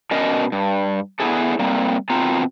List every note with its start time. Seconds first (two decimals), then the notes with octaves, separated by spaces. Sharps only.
0.11 B2 C#4 D4 A#4 D#5
0.52 G2
1.20 B3 C4 D4 E4 G#4 A4
1.59 G3 A#3 C4
2.10 B2 D#3 C4 F4 A#5